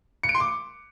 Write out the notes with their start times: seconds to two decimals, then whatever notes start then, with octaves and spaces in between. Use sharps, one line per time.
0.23 C#7
0.29 D7
0.35 C6
0.40 D6